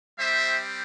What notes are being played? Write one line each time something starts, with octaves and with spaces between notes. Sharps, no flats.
G3 C4 G4 C5 E5